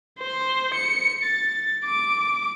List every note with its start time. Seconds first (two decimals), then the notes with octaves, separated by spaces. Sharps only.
0.19 C5
0.74 C#7
1.23 A6
1.84 D6